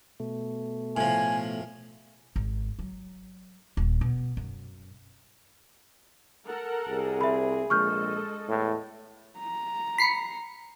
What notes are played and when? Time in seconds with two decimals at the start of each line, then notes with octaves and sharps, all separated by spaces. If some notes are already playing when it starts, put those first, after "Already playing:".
0.20 B2 A3
0.97 A2 F3 G#5
2.36 G#1
2.79 F#3
3.77 D#1
4.01 B2
4.37 F#2
6.47 A4 A#4 F#5
6.89 C2 G#4
7.21 C4 E5 B5
7.70 A#1 G#3 A4 D#5 C#6 F6 G6
8.49 E2 A2
9.39 A#5
9.98 B5 C7 C#7